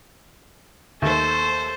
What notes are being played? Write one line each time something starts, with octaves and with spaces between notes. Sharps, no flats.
D#2 A4 C5 E5